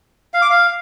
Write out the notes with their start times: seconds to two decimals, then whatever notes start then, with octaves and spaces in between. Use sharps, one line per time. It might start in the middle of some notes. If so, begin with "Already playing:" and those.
0.34 F5
0.42 D6
0.50 F5